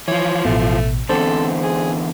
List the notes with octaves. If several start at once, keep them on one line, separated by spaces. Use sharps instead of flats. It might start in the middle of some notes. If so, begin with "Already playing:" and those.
E3 F3 C#5
A1 B2 A3
E2 D3 C4 A4 C5
G#4